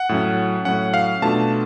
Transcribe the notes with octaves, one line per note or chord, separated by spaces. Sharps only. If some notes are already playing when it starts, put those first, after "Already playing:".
Already playing: F#5
A2 F#3 C#4
A2 F#3 C#4 F#5
F5
B2 A3 D4 F4 A5